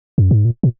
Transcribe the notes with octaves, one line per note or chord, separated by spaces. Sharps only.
F#2
G#2
A#2
A#2